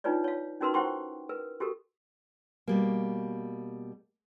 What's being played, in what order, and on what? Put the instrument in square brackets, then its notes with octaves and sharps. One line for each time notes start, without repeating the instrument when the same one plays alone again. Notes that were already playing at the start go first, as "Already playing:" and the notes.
[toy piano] D4 D#4 F4 B4 C#5 D5
C#5 F5
C#4 D#4 F#4 A#4 B4 C6
E4 C5 F#5 G5 C6 C#6
A#4 B4
F#4 G4 A4 A#4
[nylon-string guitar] B2 G3 A#3